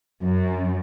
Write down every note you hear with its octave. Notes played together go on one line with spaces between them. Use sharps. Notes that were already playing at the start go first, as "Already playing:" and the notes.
F#2